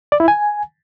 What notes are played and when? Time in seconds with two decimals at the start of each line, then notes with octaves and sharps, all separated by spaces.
0.12 D5
0.20 E4
0.28 G#5